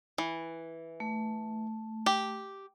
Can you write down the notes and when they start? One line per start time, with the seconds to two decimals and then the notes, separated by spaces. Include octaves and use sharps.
0.18 E3
1.00 A3
2.06 G4